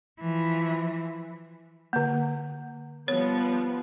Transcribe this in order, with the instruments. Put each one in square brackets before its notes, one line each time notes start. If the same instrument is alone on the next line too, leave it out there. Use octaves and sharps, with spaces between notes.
[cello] E3 F3
[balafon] D3 A#3
[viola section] F3 G3 B3 [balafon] C#5